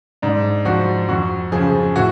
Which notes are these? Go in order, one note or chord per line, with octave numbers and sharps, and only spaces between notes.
G#2 D4
F3 F#4
F2 F#4
C#3 F3 G#4
A2 F#4